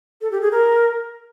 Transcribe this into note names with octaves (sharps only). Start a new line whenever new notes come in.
A4
G4
G#4
A#4